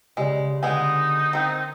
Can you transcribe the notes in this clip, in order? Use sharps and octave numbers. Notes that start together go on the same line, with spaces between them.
C#3 G#3 G4 D5
D3 G#3 B3 D#4 G#5
D#3 C4